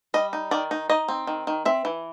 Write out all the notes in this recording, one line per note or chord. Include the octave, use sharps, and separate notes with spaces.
G3 D#5
D#4
D#3 D5
D#4
D#4 D#5
C4
D#3
D#3
C4 E5
E3